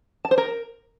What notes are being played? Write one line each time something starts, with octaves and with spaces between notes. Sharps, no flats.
A5
C5
A#4